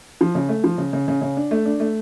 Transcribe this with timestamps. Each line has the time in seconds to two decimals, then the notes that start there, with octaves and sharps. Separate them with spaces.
0.21 F3
0.35 C#3
0.49 A3
0.64 F3
0.78 C#3
0.93 C#3
1.08 C#3
1.21 C#3
1.37 D4
1.51 A3
1.65 D4
1.80 A3